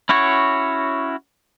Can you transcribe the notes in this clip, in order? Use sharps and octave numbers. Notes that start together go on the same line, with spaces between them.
C#4 E4 F#4 C#5